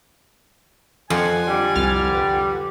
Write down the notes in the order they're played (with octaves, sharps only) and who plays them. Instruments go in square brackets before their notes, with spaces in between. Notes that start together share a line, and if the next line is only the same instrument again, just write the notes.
[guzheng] F2 [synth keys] F5 F#5 [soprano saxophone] G#5
[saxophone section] D3 G3
[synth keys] C2 F6 A6
B4